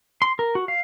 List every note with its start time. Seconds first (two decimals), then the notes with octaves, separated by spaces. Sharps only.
0.22 C6
0.39 A#4
0.55 F#4
0.68 F5